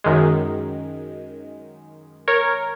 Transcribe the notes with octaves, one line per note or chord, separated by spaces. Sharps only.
F#2 D#3 G#3
A#4 C#5